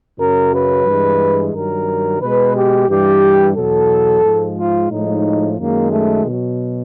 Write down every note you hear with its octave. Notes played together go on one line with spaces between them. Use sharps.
F#2 C#3 F#3 A#4
B4
G2 E3 G#3
G2 D#3 F#3 A#4
B2 G#3 B4
G4
G2 E3 G3 G4
E2 B2 F#3 A4
G#2 F3 G#3
F4
A2 F3 G#3 D#4
F#2 D#3 G#3 A#3
A3
B2 F#3